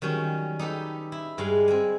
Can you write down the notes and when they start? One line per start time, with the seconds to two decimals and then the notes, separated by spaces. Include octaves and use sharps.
0.02 D#3 F#3 G3 C#4
0.59 D#4 G4 A4 B4
1.12 E4
1.38 G2 G#3 D5 F5
1.68 C4 G#5